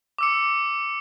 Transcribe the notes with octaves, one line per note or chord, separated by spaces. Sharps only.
D6 E6 C#7